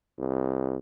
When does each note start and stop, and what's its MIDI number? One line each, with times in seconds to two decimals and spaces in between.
0.19 0.77 36